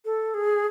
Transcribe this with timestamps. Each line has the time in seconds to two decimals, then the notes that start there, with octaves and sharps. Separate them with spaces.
0.05 A4
0.34 G#4